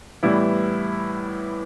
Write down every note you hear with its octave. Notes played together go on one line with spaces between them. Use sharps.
A2 E3 G3 B3 E4